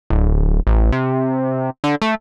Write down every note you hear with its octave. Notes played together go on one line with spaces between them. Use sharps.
D1
A1
C3
D3
A3